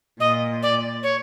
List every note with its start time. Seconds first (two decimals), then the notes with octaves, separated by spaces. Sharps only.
0.20 A#2 D#5
0.63 D5
1.03 C#5